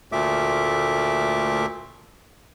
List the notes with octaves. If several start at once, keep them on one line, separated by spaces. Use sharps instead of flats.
D2 A#2 A3 E5 D6